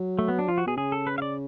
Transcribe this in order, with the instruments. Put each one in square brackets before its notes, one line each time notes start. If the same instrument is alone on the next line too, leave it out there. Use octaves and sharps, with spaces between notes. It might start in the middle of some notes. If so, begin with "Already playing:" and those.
Already playing: [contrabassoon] F#3
[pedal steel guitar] A3
B3
D4
[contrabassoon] F3 [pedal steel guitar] F4
[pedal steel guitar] F#4
[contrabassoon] B2 [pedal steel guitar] G#4
[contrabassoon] C#3 [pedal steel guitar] G#4
[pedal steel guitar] A4
B4
F5
D5